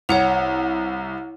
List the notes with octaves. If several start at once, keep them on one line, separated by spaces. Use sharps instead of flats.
C2 C#5 F#5 F7